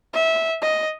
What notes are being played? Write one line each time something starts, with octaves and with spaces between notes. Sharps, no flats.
E5
D#5